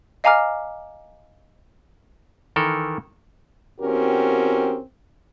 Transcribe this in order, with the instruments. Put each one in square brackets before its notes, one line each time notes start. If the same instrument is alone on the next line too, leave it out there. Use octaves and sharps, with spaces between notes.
[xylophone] D#5 F5 G#5 A#5 D6 F6
[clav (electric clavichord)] D#3 E3 A4 A#4
[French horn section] E2 C4 C#4 F#4 G4 A#4